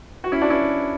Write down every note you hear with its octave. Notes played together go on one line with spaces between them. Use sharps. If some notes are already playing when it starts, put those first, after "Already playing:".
F#4
C#4 E4
D4 F#4
C#4 E4